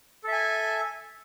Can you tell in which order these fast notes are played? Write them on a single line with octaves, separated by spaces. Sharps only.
A4 E5 G#5